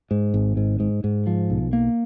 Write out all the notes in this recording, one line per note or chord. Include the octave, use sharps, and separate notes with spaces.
G#2
G#1
G#2
G#2
G#2
F3
B1
A#3